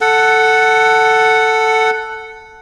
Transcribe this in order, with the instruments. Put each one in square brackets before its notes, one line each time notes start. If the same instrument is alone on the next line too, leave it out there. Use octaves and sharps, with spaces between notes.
[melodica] A4 F#5